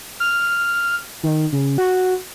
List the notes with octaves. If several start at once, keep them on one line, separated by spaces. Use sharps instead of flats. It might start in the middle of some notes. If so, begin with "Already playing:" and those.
F6
D#3
C#3
F#4